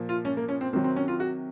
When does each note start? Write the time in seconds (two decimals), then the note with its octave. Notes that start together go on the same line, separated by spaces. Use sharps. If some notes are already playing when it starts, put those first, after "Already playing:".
Already playing: A#2 F3
0.09 F4
0.25 C#4
0.37 A#3
0.49 C#4
0.61 C4
0.73 C3 D#3 F#3 C4
0.84 C4
0.96 C#4
1.08 F4
1.20 F#4